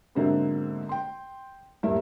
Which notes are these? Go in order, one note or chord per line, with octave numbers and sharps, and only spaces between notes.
G#2 B2 D3 A#3 C4 E4
G5 C6
D#1 G2 A#3 E4